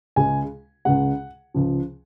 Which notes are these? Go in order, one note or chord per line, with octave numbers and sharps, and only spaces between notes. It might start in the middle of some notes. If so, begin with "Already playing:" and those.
C#2 C#3 G#3 G#5
C#2 C#3 G#3 F#5
C#2 C#3 F3